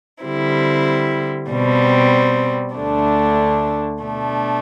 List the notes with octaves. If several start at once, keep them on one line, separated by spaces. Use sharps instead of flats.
D3 G3 C4 E4
B2 G3 C4
D2 D3 A3 D4
B2 A3 D4